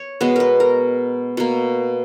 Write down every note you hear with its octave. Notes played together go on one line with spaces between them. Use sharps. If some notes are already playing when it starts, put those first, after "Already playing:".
Already playing: C#5
B2 G#3 B3 B4
A#4 B4
A#4
B2 A#3